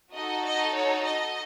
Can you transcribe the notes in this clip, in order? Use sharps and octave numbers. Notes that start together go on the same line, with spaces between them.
D#4 F#4 A4 D#5
D#5
C#5
D#5